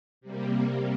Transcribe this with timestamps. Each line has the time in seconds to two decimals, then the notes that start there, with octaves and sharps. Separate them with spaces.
0.21 C3 G3 A#3